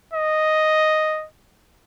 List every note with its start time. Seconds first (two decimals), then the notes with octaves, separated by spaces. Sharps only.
0.14 D#5